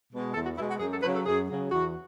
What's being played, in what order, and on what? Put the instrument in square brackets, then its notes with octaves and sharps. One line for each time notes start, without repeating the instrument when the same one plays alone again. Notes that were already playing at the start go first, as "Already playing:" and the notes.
[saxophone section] B2 G#3
E2 A4
F#4
B2 E4
G#3
F#4
F#2 G#4
A4
C#3 F#3 B4
A4
F#2 G#4
C#3 F#3
E2 F#4